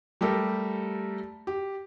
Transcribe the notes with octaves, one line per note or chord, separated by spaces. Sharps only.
G3 A3 G4 A4 A#4
G4